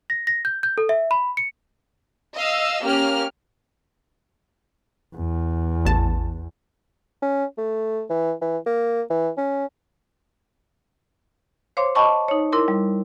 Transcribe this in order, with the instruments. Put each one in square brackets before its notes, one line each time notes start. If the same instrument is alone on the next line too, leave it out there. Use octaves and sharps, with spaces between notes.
[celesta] A#6
A#6
G6
G6
A4
E5
B5
C#7
[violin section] D#5 F5 E6
A#3 C#4 G4 F6
[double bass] E2
[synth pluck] A1 A5
[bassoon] C#4
A3
E3
E3
A#3
E3
C#4
[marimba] C5 C#5 F5 C6 D6
D#5 G5 A5 B5 C#6 D6
D#4 C#5
E4 A#4 C6 D6
G3